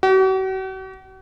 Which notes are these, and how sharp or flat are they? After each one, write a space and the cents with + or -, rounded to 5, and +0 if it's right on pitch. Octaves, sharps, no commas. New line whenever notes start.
F#4 +45